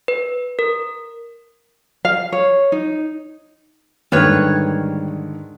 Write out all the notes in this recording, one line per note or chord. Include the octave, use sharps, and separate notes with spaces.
B4
A#4
F5
C#5
D#4
G#2 D3 D#3 G3 B4 C#5